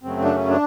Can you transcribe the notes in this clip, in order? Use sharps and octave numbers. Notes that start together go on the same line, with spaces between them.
F#2 C#3 F#3 A3 C4
D4
C#4
D4